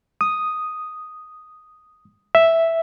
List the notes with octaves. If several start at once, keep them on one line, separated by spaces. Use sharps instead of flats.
D#6
E5